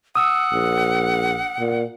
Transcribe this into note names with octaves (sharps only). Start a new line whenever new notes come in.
F#5 D#6 E6
A#1
A#2